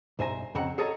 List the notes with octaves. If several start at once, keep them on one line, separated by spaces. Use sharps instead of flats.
B1 G2 C5 E5 G#5 A#5
F2 C#3 C4 F#5 A#5
G#4 A4 C#5 D#5 A#5